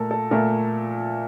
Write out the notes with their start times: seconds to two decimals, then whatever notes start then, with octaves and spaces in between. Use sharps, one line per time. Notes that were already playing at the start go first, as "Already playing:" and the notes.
Already playing: A#2 A3 A4 A#4
0.11 A4
0.31 A#2 A3 A#4